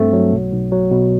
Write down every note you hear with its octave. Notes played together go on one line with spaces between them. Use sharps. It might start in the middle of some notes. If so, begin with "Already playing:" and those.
Already playing: G2 A3 C4
F#3
B1
B1
F#3
B2